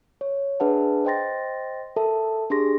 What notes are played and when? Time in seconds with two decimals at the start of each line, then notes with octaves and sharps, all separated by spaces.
0.21 C#5
0.60 D4 G#4 B4 E5 F#5 A5
1.05 C5 D#5 G5 C6 A6 A#6
1.96 A4 A#4 E5 A5
2.50 D4 G4 G#4 C6 A#6